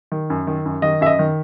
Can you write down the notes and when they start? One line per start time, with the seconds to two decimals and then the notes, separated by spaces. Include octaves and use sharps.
0.12 D#3
0.30 F#2
0.47 D#3
0.66 F#2
0.82 D#3 D#5
1.01 F#2 E5
1.06 D#5
1.19 D#3